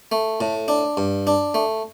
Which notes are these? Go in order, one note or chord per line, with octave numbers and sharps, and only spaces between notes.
A3
A2
D4
G2
D4
A3